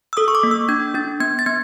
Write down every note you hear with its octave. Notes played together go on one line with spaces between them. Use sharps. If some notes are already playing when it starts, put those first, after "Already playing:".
E6
A4 D#6
C#6
D6
A#3
E6
D4 G#6
D4 A6
B3 G#6
A6
B3 G#6